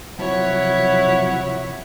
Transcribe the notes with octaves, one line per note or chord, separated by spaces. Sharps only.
C3 F3 F#3 E4 C#5 F#5